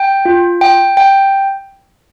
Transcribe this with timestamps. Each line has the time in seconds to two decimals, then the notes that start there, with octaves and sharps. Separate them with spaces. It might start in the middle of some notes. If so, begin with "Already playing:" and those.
Already playing: G5
0.25 F4
0.61 G5
0.97 G5